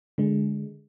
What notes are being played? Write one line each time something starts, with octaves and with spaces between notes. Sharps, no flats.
D3 G#3